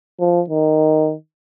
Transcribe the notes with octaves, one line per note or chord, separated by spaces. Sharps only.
F3
D#3